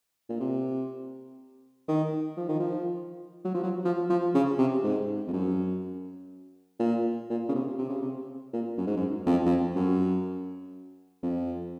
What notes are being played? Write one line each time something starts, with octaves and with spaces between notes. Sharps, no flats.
A#2
C3
D#3
F3
D#3
F3
F#3
F3
F#3
F3
F3
C#3
C3
G#2
F2
F#2
A#2
A#2
C#3
C3
C3
C#3
C3
A#2
F#2
G#2
F#2
F2
F2
F#2
F2